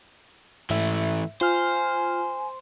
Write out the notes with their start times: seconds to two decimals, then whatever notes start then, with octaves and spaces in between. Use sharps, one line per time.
0.70 G#2 E3 A3 E5
1.41 F4 C5 G#5 F6